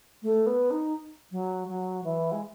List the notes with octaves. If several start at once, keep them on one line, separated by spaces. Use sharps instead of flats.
A3
B3
D#4
F#3
F#3
E3
G#3